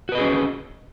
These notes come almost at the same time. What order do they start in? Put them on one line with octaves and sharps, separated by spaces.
F#4 B4 D#5 G#4 C#4